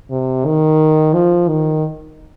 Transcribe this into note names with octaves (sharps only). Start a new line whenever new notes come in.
C3
D#3
F3
D#3